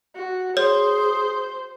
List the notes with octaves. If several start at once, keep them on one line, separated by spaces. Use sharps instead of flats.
F#4
G#4 C5 C#5